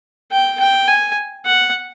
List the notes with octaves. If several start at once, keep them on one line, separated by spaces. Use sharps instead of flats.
G5
G5
G#5
F#5